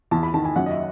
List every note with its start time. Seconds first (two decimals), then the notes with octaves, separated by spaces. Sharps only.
0.11 E2 A5
0.23 B5
0.34 D#3 A5
0.45 G#5
0.56 F#2 F#5
0.66 D#5
0.71 E5